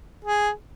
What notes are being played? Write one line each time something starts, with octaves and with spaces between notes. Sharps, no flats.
G#4